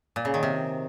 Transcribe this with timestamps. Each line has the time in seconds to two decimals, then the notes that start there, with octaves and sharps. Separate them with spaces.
0.16 A#2
0.25 C#3
0.34 D#3
0.43 C3